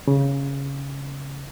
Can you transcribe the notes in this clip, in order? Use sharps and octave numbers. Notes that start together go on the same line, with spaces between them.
C#3